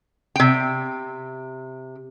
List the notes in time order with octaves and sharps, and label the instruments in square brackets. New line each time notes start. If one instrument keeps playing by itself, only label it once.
[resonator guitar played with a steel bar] C3 G5